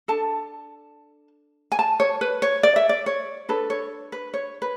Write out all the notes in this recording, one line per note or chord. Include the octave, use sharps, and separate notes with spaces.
D4 A4 A5
G#5
A5
C#5
B4
C#5
D5
E5
D5
C#5
D4 A4 B4
C#5
B4
C#5
B4